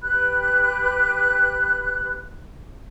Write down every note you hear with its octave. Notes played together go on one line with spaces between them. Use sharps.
G4 B4 B5 F#6